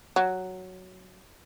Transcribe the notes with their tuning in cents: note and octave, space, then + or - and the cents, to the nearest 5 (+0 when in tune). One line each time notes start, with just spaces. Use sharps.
F#3 +0